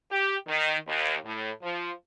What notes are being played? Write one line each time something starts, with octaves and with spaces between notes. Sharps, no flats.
G4
D#3
D#2
A2
F3